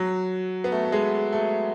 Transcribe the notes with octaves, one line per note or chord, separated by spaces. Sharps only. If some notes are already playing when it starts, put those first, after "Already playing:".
Already playing: F#3
B3
A3
A3
G#3
A3